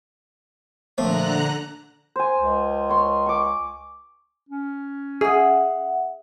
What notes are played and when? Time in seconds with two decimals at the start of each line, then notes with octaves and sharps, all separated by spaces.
0.98 A#1 D3 A3 C5 A#5 F#6
2.16 C5 G#5
2.38 C#2
2.89 C#5 C6
3.26 C#6 D6
4.49 C#4
5.21 G#4 E5 F#5